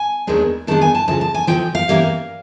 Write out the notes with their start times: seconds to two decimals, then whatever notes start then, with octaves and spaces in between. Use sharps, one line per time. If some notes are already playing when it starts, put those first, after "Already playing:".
Already playing: G#5
0.27 D#2 D#3 G#3 B3 D4
0.67 D#2 D#3 G#3 B3 D4 A5
0.81 G#5
0.95 A5
1.08 D2 C#3 F3 A5
1.21 A5
1.34 G#5
1.47 D2 C#3 F3 G5
1.75 F5
1.88 G2 E3 G3 A#3 C#4